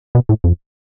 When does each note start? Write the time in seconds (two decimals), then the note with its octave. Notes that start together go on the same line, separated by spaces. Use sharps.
0.15 B2
0.29 A2
0.44 F2